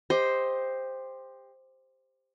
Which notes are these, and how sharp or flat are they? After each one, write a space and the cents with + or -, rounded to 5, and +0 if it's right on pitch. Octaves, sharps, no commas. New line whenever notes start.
G4 +20 C5 +0 D#5 +15